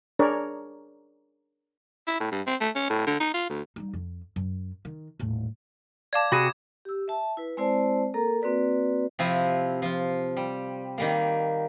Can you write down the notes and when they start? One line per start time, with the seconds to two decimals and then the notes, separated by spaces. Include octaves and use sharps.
0.19 D4 G#4 A#4 C#5 D5
2.07 E4
2.20 A2
2.32 G2
2.47 C4
2.60 A3
2.75 C#4
2.90 A2
3.07 D3
3.20 D#4
3.34 F4
3.49 D2
3.76 G3 D#4
3.93 F2
4.36 F#2
4.85 D#3
5.19 D#1 A2
6.13 D5 F5 A5 D6 G#6
6.32 C3 F#4 G#4 B5
6.85 G4 E6
7.08 E5 A5
7.37 E4 B4
7.57 G#3 C4 E4 C5 D5 A5
8.14 A#3 A4 A#4 A#5
8.42 A#3 C4 F#4 B4 D5
9.19 C3 F3 E4
9.82 F3 F4
10.37 G3
10.98 D#3 G3 A#3